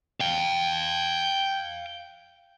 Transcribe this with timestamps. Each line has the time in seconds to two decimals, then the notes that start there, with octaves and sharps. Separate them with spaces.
0.20 F5 G5